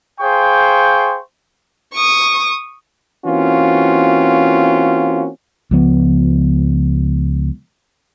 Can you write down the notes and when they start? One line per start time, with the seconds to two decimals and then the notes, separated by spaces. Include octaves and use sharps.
0.21 G#4 C5 F5 G5 C#6
1.93 C#6 D#6
3.26 E3 A#3 C4 C#4 F4 F#4
5.71 C#2 F3 B3